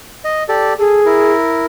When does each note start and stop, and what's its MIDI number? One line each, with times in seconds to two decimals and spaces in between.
0.24 0.43 75
0.49 0.73 67
0.49 0.73 69
0.49 0.73 74
0.79 1.33 68
0.79 1.01 69
1.05 1.66 64
1.05 1.66 70